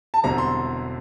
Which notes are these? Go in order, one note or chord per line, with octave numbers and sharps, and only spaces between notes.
A5
E1 E2 D3 G3 C4 A#5
C6